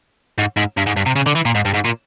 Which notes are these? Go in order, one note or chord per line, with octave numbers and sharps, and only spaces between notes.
G#2
G#2
G2
G#2
G2
C3
C#3
D3
E3
A#2
G#2
G2
G#2
A#2